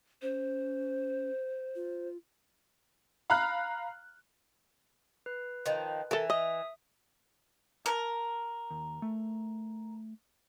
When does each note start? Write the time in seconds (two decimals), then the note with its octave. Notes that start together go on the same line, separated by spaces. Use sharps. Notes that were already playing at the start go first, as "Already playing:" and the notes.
0.22 C#4 C5
1.75 F4
3.30 F5 A#5 B5 F6 F#6
5.26 B4
5.66 D#3 F3
6.11 E3 A4 A#4
6.30 D#5 E5 D#6
7.86 A#4 A5
8.70 D#2
9.02 A3